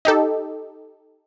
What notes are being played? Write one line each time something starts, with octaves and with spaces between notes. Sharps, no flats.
D#4 G4 A4